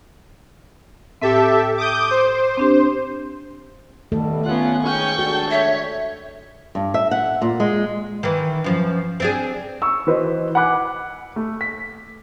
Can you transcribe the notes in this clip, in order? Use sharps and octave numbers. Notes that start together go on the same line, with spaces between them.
A2 C4 G4 A4 E5
D6 D#6 G6
C5
C4 D4 G4
B2 D#3 G3 A3 A4
B3 C#4 F4 F#5
G#2 C#4 G5 C#6
G#3 D4 F#4 A4
C#5 E5
G2
E5
F#5
A#2
G#3
D#3 E3
F#2 F3
C4 D4 G#4
C#6 E6
E3 F#4 B4 C5 D#5
F#5 G#5 B5 D6 F#6
A3
B6